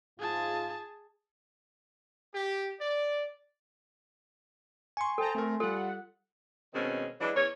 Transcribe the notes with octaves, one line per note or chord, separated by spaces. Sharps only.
G#2 F4 G#4 A5
G4
D5
G#5 C6 C#6
A4 C5 G5 A5 A#5
A3 C4 A#4
G3 F4 A4 F#5
B2 D#3 G#3 C4 C#4
E3 F#3 G#3 D4
E2 C#4 C#5